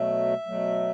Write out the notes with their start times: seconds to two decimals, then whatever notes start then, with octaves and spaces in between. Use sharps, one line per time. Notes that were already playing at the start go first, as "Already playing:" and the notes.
Already playing: B2 F#3 A3 E5
0.46 B2 F#3 A3